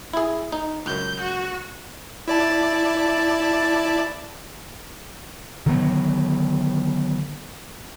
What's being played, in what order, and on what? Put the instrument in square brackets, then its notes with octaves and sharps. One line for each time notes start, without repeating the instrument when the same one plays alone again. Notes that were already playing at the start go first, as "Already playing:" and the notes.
[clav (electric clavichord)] E4 G#4
D#4
[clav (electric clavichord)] C#2 F#2 [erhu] G6
[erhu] F#4
[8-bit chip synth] E4 D5 A5
[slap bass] D3 D#3 F#3 B3